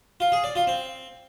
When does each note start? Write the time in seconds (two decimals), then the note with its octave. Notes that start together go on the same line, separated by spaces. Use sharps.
0.20 F4
0.32 G#4
0.44 D5
0.55 F4
0.67 C4